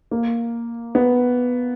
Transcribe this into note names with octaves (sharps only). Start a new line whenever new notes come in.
A#3
B3